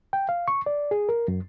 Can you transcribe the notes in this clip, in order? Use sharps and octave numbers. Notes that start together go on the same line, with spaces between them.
G5
F5
C#6
D5
G#4
A#4
F#2